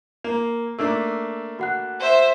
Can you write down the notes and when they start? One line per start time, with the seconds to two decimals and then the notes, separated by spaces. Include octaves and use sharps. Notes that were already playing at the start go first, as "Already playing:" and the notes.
0.24 A#3
0.79 A3 A#3 D4 E6
1.59 F#4 F#5 F#6
2.00 C5 E5